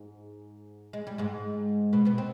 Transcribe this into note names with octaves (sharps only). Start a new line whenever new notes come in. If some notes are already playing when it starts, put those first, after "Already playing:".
Already playing: G#2
G#3
G3
G#2 G#3
B2 B3
B2 B3
C4